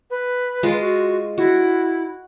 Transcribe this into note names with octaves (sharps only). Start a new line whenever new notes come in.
B4
G#3 F4
F#4
E4 F#4